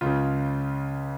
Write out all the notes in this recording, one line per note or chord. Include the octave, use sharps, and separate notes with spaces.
C#2 C#3 F4